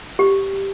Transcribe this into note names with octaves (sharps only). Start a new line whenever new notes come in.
G4